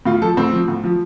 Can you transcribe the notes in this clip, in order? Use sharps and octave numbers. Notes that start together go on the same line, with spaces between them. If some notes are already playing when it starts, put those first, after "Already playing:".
A2 F4
F3 A4
A2 C4
F3
A2
F3